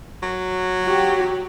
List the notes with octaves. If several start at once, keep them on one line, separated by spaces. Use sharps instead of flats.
F#3
F#4 G4